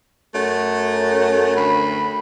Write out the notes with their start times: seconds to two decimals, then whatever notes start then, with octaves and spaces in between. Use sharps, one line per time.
0.35 F#2 A3
1.57 D2 B5